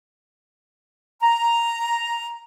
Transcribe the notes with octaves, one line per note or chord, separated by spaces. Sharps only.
A#5